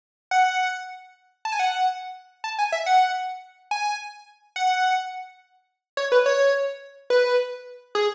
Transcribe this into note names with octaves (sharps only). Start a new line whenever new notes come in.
F#5
A5
G#5
F#5
A5
G#5
E5
F#5
G#5
F#5
C#5
B4
C#5
B4
G#4